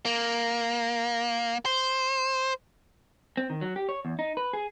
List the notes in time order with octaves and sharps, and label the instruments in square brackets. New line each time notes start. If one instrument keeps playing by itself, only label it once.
[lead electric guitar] A#3
C5
[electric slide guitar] C4
D#3
F#3
G4
C#5
E2
D#4
B4
G#4